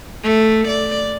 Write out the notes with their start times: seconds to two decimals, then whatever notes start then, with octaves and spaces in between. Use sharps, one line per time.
0.23 A3
0.68 D5